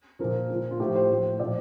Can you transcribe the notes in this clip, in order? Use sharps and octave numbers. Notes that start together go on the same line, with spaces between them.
A#2 F3 A#4
F3
A#2
F4
A2 F3 G4
C5
A2 F3
A#2 F3 D5